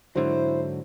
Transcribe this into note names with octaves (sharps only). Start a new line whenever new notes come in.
G#2 D3 F#3 E4 C5